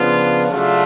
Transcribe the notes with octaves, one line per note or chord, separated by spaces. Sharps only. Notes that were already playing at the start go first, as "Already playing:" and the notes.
Already playing: C#3 F3 B3 D4 F4
C#3 F#3 A3 D4 F4